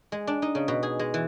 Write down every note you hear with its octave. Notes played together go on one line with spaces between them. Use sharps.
G#3
D4
D#4
C#3
B2
G#4
G#3
E3